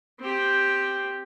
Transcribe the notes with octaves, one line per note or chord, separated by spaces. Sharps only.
C4 G4